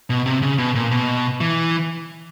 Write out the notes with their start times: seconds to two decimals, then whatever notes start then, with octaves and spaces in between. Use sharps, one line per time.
0.10 B2
0.26 C3
0.42 C#3
0.58 B2
0.75 A#2
0.91 B2
1.41 E3